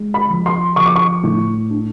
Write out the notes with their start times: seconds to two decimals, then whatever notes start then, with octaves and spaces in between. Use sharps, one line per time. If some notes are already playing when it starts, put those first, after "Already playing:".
Already playing: G#3
0.14 B5
0.30 F3
0.46 C6
0.76 F3 C#6
0.86 D6
0.96 C#6
1.23 A2
1.70 D4